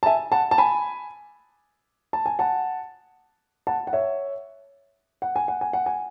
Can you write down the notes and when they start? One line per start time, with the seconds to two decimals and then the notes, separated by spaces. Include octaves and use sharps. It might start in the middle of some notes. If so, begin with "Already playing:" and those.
0.03 A5
0.06 E5 G#5
0.32 F#5 A5
0.51 A5
0.58 G#5 B5
2.13 A5
2.26 G#5
2.39 F#5 A5
3.67 F#5 A5
3.87 F#5
3.93 C#5 E5
5.22 F#5
5.36 G#5
5.48 F#5
5.61 G#5
5.73 F#5
5.86 G#5